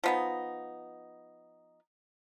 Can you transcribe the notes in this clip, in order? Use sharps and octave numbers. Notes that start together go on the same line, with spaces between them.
F3 B3 D#4